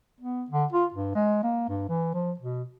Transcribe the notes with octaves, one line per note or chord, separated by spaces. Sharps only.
B3
D3
F4
G2
G#3
A#3
G2
E3
F3
B2